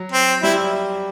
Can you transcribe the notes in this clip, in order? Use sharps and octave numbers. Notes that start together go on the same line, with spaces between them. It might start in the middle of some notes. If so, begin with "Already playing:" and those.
Already playing: F#3
C4
G3 E4